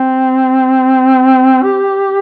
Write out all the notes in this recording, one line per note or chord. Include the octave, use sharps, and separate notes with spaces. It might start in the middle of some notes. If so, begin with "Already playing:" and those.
Already playing: C4
G4